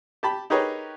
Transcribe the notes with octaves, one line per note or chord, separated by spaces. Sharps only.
G4 A5 B5
D#4 G4 G#4 A#4 B4 C#5